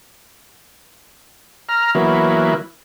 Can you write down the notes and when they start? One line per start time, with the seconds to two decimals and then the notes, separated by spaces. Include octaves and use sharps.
1.69 A#5 F6
1.95 E3 F#3 A#3 B3 E4